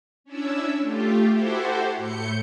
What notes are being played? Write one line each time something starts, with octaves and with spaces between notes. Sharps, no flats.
C#4 D4 E4 E5
A3 F4 G4
E4 F#4 G4 A4 C5
A2 A3 G6 C#7